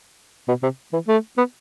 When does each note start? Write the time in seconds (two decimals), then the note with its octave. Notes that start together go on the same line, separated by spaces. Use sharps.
0.48 B2
0.63 C3
0.93 E3
1.08 A3
1.38 B3